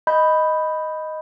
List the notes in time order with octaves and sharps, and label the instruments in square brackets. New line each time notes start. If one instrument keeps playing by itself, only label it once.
[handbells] D#5 B5 G6